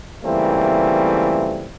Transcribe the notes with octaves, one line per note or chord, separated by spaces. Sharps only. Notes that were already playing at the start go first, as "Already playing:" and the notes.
C#2 E3 G3 A3 A#3 C4